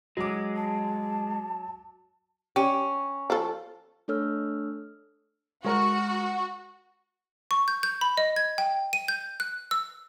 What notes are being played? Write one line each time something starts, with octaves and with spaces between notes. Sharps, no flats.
F#3 G#3 D6
A5
C#4 G4
F3 A4
A3 D4 A4 C#5 E6 F6
G#3 F#4 A#4
C#6
G6
G6
B5
D#5
G#6
G5
D#7
G6
F#6
E6